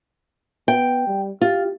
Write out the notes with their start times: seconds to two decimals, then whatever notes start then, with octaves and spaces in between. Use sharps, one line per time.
0.68 B3 G5
1.07 G3
1.41 F4 G4